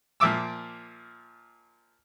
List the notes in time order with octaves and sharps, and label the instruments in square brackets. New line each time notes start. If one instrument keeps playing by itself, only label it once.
[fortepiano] A#2 F3 E5 D6 E6